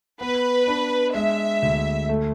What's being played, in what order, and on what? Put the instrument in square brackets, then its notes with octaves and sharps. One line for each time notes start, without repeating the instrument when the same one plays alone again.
[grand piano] B3 [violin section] B4
[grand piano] D4
[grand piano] G#3 [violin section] E5
[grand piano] D2
A3